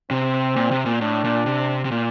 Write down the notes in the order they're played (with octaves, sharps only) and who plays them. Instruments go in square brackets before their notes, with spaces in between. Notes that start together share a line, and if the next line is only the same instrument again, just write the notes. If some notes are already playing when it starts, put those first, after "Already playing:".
[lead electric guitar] C3 [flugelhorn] C4
[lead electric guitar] A#2
C3
A#2
[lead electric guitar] A2 [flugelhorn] D4
[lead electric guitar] A#2
C3
C3
A#2